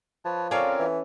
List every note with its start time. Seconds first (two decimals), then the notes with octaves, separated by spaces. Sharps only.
0.25 F3 B4 C#5 A5
0.51 C4 C#4 F4 A4 A#4 C#5 D5 F5
0.80 E3